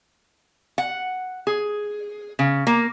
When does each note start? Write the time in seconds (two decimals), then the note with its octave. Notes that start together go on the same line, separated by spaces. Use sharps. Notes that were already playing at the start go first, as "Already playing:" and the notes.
0.78 F#5
1.47 G#4
2.39 C#3
2.67 A#3